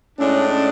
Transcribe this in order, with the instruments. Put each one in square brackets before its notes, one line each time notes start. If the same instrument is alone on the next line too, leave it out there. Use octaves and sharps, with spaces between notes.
[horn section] A2 G#3 D4 [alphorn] C#4